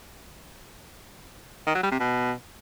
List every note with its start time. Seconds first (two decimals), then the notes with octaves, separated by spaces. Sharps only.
1.67 D#3
1.75 F#3
1.83 G3
1.92 C3
2.00 B2